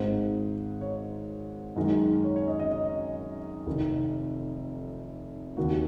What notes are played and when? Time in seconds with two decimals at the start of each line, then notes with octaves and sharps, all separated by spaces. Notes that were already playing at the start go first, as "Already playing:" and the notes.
Already playing: G#1 G#2 D#3 C5
0.81 C#5
1.76 F#2 D#3 G#3
2.24 C#5
2.36 C#5
2.48 D#5
2.59 D#5
2.72 D#5
3.67 F1 F2 D#3
5.57 D#2 D#3 A#3 F#4